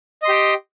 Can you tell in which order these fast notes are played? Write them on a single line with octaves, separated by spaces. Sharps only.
D#5 C6 G4 G5